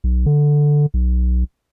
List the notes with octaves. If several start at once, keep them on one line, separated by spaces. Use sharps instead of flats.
B1
D3
B1